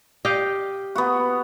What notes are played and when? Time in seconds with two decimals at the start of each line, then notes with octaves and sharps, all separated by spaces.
0.25 G4 D#5 F5
0.96 B3 F#4